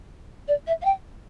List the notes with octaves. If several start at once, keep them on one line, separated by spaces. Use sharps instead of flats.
D5
E5
F5
G5